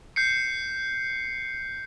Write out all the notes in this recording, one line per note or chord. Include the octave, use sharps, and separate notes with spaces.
G6 C7 C#7